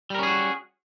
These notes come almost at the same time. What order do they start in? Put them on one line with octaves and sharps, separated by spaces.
G3 A#4 C#4 G#4 F#4